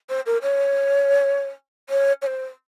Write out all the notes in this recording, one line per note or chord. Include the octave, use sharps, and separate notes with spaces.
C5
A#4
C#5
C#5
C#5
C5